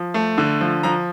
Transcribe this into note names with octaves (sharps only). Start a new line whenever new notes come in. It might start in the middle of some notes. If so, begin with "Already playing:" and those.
Already playing: F3
A3
D3
F3
F3 A#5